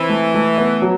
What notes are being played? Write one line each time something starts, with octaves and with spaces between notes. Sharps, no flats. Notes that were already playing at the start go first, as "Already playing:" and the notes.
Already playing: E3 C4
A3
A3
B3
F#3